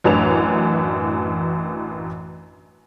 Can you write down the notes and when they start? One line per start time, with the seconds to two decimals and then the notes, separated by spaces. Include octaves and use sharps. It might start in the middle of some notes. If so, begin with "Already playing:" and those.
0.04 A1 F#2 E3 D4 A#4 F7